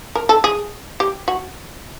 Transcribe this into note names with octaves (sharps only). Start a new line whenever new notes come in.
A#4
A4
G#4
G4
F#4